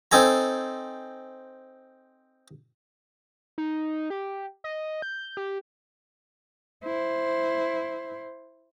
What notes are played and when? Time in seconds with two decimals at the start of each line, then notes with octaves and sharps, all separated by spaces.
0.11 C4 D#4 A4 G#5 A#5
3.58 D#4
4.10 G4
4.64 D#5
5.02 G6
5.37 G4
6.84 E4 C5